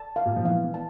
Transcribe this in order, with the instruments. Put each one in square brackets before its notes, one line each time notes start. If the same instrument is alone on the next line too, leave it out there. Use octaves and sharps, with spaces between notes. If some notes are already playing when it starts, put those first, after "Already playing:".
Already playing: [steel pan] A5
F5
[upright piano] A#2
F3
[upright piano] E3 [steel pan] F5
[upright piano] E3
[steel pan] A5